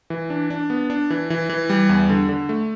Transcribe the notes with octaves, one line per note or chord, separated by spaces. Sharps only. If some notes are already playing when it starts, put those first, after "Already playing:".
E3
D4
D4
B3
D4
E3
E3
E3
G3
E2
D3
D3
A3